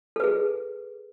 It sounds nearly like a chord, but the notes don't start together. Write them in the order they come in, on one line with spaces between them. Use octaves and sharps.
A4 B4 G#4